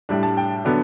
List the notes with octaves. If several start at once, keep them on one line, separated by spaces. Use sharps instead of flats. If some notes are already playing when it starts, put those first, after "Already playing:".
A2 G3 D4
A5
G5
D3 F#3 B3 D4